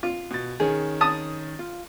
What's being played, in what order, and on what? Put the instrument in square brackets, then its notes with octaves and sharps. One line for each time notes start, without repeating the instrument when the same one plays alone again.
[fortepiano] F4
[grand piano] B2 A6
[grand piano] D#3 C#4 [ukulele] G#4
[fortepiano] A5 D#6
[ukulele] F4